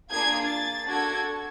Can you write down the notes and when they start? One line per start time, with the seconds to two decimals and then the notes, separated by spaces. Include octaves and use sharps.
0.12 A#3 D4 F4 G#4 G#6
0.50 A6
0.88 D4 F#4 A4 G#6